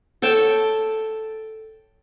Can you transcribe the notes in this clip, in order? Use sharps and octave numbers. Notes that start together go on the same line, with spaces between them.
A4 C#5 G5 A5